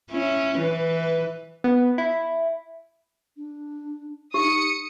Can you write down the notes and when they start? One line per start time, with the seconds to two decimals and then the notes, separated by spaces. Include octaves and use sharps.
0.11 C#4 E4
0.58 E3 B4
1.64 B3
1.98 E4
3.36 D4
4.34 D#4 G4 D#6 C#7